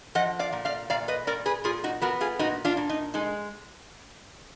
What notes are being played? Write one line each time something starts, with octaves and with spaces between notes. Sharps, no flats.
F3 D#5 F#5
D5 F5
A#2
D5 F5
A#2 D5 F5
B4 D#5
A#2 A#4 D5
G#4 B4
A#2 F4 G#4
D#4 F#4
B3 F#4 A#4
F4 G#4
A#2 D#4 F#4
D4 F4
A#2
D#4
G#3 D#4